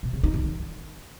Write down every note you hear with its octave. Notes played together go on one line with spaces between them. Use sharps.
B2
C#3
D#4
D3
D#3